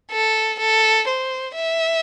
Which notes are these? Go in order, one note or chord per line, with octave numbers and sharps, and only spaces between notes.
A4
A4
C5
E5